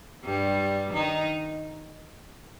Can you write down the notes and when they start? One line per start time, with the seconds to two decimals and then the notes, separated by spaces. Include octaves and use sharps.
0.24 G2 G3
0.93 D#3 D#4